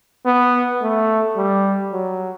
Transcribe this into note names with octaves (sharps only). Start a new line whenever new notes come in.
B3
A3
G3
F#3